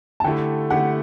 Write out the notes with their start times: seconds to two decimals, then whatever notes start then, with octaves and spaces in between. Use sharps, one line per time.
0.20 A5
0.24 D3 A3 E4 G4 G5
0.70 D3 A3 E4 G4 F#5